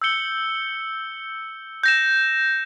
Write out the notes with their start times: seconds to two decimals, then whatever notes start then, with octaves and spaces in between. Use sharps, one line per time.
0.02 E6 G6 C#7 G7
1.84 G6 A#6 E7